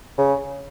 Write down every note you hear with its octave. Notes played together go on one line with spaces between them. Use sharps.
C#3